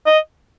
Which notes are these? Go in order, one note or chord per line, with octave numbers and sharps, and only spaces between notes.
D#5